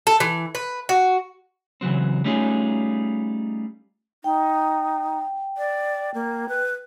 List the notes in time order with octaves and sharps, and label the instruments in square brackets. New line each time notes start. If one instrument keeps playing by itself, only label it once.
[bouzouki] A4
E3
B4
F#4
[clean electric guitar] C#3 E3 F#3 C4
G3 A3 C#4 D#4 F4 G#4
[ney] D#4 [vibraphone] G5
[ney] D5
A#3
B4